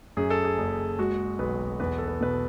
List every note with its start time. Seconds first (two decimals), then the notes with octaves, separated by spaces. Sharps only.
0.17 F#2 G#4
0.30 A4
0.44 G#4
0.58 F#1
0.99 G#3 F#4
1.39 B1 B4
1.80 E2 B4
1.98 A4
2.07 B4
2.21 B2 B4